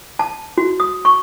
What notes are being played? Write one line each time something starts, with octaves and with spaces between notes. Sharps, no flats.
A5
F#4
D#6
C#6